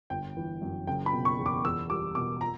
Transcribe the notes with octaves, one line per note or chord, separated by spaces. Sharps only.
G1 G5
E3
F#2
F#1 G5
B5
B2
C#6
E2
D6
E2 E6
G3 D6
B2 D6
A#5